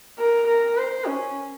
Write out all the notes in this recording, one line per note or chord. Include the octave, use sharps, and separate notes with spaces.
A#4
A#4
C5
C#4